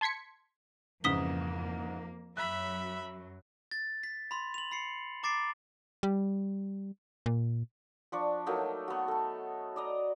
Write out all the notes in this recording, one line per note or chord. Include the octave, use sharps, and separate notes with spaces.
A5 C6 G#6 B6 C#7
F2 G#2 C#3 E3 A#3 D#6 B6 G7
F#2 F#3 E5 B5 F#6
A6
B6
B5 C6
F7 F#7
B5 C7 C#7
A#5 D6 A6 C7 D7
G3
A#2
F3 D4 C#6
F#3 A3 A#3 D#4
B3 F#4
A4 A5
D5 D#5 A#5